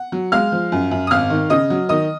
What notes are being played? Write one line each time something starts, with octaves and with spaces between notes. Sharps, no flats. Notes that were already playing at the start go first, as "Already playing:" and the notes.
Already playing: F#5
F#3
G#3 F5 F6
F3
F#2
F#2
D#6
G#1 F5 F6
D#3
C#3 D#5 D#6
F#3
D#3 D#5 D#6